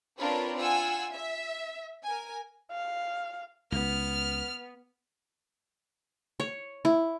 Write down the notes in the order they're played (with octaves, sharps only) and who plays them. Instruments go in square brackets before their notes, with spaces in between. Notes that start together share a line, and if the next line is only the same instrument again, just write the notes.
[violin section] C4 D4 F4 A#4 B4 C#5
F4 F#5 G#5 E6
E5
A#4 G#5
[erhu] F5
[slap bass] C#2 [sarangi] B3 [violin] F6
[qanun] C#5
E4